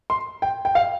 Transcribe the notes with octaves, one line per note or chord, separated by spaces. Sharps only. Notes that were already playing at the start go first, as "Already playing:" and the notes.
C6
G5
G5
F5